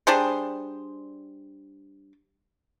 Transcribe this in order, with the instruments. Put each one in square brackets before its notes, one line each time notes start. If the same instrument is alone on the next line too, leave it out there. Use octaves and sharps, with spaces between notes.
[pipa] G3 D4 G#4 C5